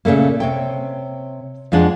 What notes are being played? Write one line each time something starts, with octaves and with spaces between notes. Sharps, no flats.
A#2 C#3 E3 A3 A#3
C3 C#5 G5
F2 F3 G#3 D4 F#5